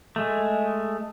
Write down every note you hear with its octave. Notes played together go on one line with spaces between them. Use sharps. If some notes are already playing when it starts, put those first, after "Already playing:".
G#3 A3